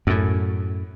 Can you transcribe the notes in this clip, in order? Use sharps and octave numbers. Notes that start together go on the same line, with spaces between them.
F#2 A2